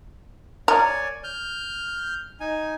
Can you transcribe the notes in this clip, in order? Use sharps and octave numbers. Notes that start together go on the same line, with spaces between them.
A#4 C#5 D5 G#5
F6 G6
D#4 G#5